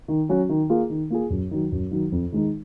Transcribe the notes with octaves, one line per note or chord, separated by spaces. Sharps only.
D#3
F#3 C#4 F#4
D#3
A#3 F4 G#4
D#3
A#3 F4 G#4
F#2
D#3 F#3
F#2
D#3 F#3
F2
D#3 G#3 D#4